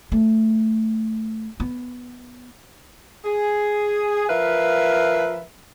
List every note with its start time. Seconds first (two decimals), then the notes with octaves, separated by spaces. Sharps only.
0.12 A3
1.60 B3
3.25 G#4
4.28 F3 A#4 B4 E5 F5